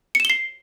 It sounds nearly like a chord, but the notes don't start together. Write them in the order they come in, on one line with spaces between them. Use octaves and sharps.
C#7 E7 G7 C7